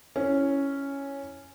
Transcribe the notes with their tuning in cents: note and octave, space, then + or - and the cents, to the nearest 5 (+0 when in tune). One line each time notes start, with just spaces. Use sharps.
C#4 +0 E4 +0